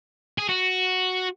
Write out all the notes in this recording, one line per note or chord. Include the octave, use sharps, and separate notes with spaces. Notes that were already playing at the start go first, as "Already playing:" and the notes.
G#4
F#4